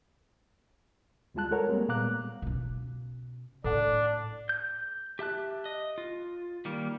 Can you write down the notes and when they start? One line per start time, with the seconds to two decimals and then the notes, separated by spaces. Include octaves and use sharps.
1.34 D2 G3 G#3 F4 A5 F#6
1.51 G#3 A4 A#4 C#5 F#5 A#5
1.69 G3 G#3 A#3 C4
1.88 A#2 B3 F5 A#5 D6 F#6
2.42 B2 C#4
3.64 A2 D4 A4 F#5
4.49 G6
5.19 G4 E5 A5 F#6
5.65 D#5
5.98 F4
6.65 D#3 G3 A#3